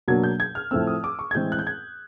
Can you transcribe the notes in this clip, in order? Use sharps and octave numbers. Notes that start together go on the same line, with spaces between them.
B2 F#3 A#3 D4 G#6
G6
G#6
F6
A2 F3 A3 C4 E6
D#6
D6
C#6
G#6
A2 E3 G#3 C4 G6
F#6
G6
G#6